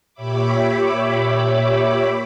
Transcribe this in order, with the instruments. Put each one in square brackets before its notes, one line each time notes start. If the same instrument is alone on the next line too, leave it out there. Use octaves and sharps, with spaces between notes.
[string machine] A#2 G4 C#5 E5 B5 D6